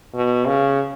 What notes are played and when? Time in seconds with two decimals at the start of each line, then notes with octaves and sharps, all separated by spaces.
0.14 B2
0.46 C#3